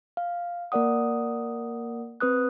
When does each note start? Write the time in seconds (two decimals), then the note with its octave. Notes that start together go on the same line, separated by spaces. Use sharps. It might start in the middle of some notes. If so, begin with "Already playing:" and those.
0.17 F5
0.72 A#3 A#4 D5 F#5 D#6
2.20 C4 B4 D#6 F#6